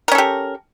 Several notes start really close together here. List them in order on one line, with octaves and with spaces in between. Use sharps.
A#4 C#4 A4 G4